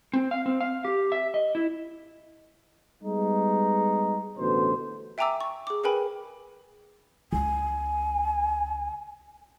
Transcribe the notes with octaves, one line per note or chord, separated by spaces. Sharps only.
C4
F5
C4
F5
G4
E5
D#5
E4
G3 G#3 B3 D#4
A1 B2 D3 C5
E5 G5 G#5 A#5 D6 E6
C#6
G#4 D6
G#4 A#4 B4 G5 G#5 B5
C#2 G#5